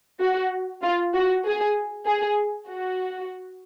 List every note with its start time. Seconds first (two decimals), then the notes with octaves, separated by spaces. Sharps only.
0.20 F#4
0.82 F4
1.14 F#4
1.45 G#4
2.06 G#4
2.69 F#4